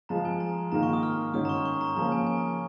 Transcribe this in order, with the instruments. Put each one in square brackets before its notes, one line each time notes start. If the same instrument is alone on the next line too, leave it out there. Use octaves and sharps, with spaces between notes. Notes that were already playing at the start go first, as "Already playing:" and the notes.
[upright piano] F3 G#3 F4 G#4 [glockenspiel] A#5
[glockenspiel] G#5
A#5
[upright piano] G#2 D#3 A#3 F4 A#4 [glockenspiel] A#5
[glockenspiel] C#6
D#6
F6
[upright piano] G#2 D#3 G#3 C#4 [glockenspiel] D#6
[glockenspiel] A#5
C#6
C#6
A#5
[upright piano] C#3 F3 A#3 C#4 G#4 [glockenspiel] A#5
[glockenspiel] G#5
G#5